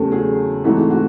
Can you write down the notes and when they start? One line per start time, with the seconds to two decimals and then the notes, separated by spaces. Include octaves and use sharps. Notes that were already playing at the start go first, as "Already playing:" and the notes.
Already playing: E2 C#3 F#3 A3 C#4 G4 A4
0.12 F#4 G#4
0.64 G#2 E3 A3 C4 F#4
0.90 F#4